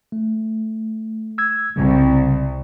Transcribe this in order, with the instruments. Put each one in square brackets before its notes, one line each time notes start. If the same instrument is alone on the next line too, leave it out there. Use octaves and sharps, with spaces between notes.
[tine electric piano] A3
E6 G#6
[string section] C2 [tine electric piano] C#3 G3